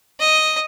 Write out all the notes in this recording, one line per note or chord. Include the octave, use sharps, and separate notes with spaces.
D#5